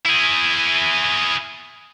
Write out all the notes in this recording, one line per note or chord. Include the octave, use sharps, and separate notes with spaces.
E4 G#4